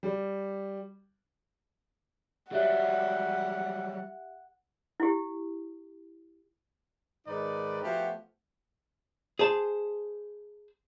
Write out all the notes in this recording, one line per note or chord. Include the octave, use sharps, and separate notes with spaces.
G3
F#3 G3 G4 E5 F#5 F#6
E4 G4
G#2 D#3 D#4 B4 D5
F3 A3 B3 F#4 G4
G#4 C5 A5